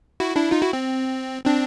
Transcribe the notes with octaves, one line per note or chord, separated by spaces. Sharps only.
E4 F#4
D4 E4
D#4 F4
E4 F#4
C4
C4 D4